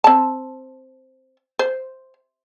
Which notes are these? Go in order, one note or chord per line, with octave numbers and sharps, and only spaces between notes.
C4 A5
C5